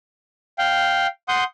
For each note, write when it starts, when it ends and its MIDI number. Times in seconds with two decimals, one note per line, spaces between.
0.58 1.07 77
0.58 1.07 79
1.28 1.44 78
1.28 1.44 84
1.28 1.44 87
1.28 1.44 91